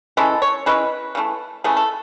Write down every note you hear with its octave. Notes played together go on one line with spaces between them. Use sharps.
E3 G#3 C#4 E4 A4
C#5
E3 G#3 C#4 E4 B4
C#3 E3 A3
C#3 E3 A3 G#4
A4